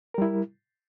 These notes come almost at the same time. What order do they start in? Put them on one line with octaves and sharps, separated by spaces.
A#4 G3 E4